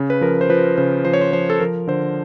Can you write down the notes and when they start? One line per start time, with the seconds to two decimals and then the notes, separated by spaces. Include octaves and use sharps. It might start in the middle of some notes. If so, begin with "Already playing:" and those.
Already playing: C#3
0.10 B4
0.21 F3 A#4
0.41 C5
0.50 F3 B4
0.78 C#3 C5
1.05 F3 C5
1.13 C#5
1.21 C5
1.33 F3 C5
1.50 A4
1.60 F3 A#4
1.87 D3 C5